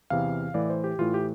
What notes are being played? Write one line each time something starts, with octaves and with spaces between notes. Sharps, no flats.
E2 C3 E3 F5
A2 E3 D5
C5
G4
A2 E3 F4
G4